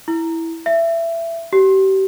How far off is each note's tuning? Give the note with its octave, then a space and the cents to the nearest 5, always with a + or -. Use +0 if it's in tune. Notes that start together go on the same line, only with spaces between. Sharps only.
E4 -5
E5 +20
G4 -35